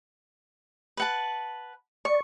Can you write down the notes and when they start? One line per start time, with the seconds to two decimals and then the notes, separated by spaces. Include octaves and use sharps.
0.97 B4 F#5 A5
2.05 D5 C#6